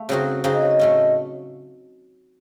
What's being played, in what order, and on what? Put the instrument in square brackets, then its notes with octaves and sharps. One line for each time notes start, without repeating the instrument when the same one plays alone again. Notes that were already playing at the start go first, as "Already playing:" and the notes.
Already playing: [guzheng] A3 [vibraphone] F5
[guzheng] C#3 F#3 C4 D#4 F#4
[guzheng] C#3 F#3 C4 D#4 F#4 [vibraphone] F5
[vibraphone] D#5
C#5
D#5
[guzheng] A2 A3 C#4